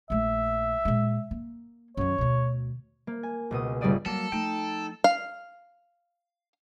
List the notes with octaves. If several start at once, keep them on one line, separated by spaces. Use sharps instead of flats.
A#1 A3 E5
A#2 G#3
A#3
F#2 D#3 C#5
D2 B2
A#3
G#5
C#2 B2 D#6
G1 C#3 G3 A3 D5 D#6
F#3 G3 A#3 A4
F3 A3 D#4 G5
F5